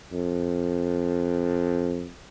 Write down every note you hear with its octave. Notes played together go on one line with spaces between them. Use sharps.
F2